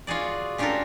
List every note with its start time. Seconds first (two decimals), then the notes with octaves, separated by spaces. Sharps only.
0.07 F4 F#4 G#4 D5
0.58 C#4 D4 F4 G4 A4 A#4